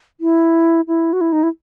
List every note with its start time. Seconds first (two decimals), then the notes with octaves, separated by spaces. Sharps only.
0.21 E4
0.88 E4
1.13 F#4
1.21 E4
1.32 D#4
1.43 E4